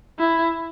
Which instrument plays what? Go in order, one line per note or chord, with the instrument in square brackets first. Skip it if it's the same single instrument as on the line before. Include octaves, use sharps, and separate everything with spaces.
[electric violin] E4